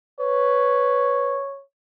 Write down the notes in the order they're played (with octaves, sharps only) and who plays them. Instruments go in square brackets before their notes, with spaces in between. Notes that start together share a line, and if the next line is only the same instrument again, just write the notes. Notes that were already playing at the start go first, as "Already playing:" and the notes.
[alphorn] B4 [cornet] C#5